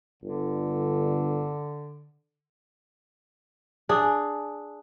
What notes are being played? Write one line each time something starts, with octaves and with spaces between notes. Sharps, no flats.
G1 D3
D4 G#4